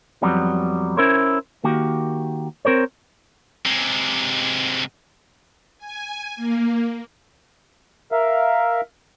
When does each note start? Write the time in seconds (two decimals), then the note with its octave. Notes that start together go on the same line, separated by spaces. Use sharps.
0.22 F2 F#3 G3 B3
0.97 C#4 E4 A#4 C5 C#5
1.64 D#3 A#3 F#4 G4
2.65 C4 A#4 C5 C#5
3.65 C3 G#3
5.78 G#5
6.36 A#3
8.12 A#4 E5 F5